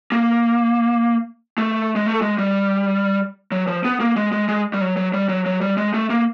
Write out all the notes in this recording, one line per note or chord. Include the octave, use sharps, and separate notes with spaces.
A#3
A3
G#3
A3
G#3
G3
F#3
F3
B3
A#3
G#3
G#3
G#3
G3
F#3
F#3
G3
F#3
F#3
G3
G#3
A3
A#3